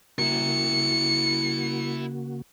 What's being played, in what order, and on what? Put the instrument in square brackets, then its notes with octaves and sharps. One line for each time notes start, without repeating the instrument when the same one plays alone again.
[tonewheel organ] C#3 A#3 F#4 [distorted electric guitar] E4 A#4 [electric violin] C#7